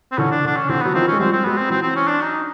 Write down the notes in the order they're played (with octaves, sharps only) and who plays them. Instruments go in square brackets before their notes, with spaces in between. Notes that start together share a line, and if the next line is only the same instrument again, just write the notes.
[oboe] C4
[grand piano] D3 E3 [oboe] C#4
[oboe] D4
[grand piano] D3
[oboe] D4
C#4
[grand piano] D3 E3 [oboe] C4
[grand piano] F#3 [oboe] B3
[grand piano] D#3 F3 [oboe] C4
[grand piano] G#3 [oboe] C#4
[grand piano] F3 G3 [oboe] C4
[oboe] C4
[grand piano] F#3 G#3 [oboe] B3
[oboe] C4
[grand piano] E3 F#3 [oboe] C4
[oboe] C4
C#4
D4
D#4